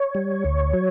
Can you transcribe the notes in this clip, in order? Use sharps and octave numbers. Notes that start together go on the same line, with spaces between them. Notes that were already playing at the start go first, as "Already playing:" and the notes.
Already playing: C#5
G3
D2
F#3